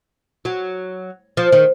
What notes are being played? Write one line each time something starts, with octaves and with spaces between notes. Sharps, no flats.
F#3
F3
D#3